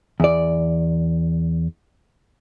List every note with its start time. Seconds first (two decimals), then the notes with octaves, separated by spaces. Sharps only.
0.20 E2 D5